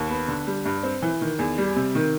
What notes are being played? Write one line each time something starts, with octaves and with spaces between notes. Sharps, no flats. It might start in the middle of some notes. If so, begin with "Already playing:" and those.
Already playing: D#2
B3
D3
G3
G2
C4
E3
D#3
E2
G3
C3
D#3